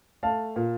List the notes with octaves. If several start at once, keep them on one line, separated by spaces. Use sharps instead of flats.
A3 F5 A5
A#2